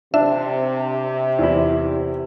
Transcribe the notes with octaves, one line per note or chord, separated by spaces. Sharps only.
C3 D4 E5
E2 E4